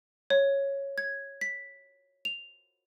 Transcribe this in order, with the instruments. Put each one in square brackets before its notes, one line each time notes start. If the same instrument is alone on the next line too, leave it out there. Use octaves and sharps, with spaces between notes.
[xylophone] C#5
G#6
B6
F7